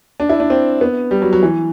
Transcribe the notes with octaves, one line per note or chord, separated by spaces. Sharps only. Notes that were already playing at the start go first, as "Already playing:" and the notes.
D4
E4
D4
C4
B3
G3
F#3
F#3
E3